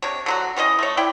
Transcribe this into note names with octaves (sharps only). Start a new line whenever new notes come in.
C3 D4 C#5
D3 F#3 F#4
E3 C#4 G#4 D#5
A3 C#5
E4 D5 G5